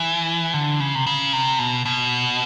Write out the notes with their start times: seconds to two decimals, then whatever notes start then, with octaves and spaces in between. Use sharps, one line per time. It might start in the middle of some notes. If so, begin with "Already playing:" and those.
Already playing: E3
0.54 D3
0.80 C#3
0.95 C3
1.07 C#3
1.33 C3
1.59 B2
1.85 B2